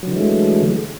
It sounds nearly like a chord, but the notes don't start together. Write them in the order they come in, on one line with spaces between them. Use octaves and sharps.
F#3 D3 E3 G#3 A3